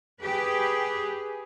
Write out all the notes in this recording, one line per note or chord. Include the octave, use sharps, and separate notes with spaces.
G4 G#4 B4